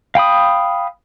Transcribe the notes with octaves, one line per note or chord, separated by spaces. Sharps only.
F5 G5 B5 D#6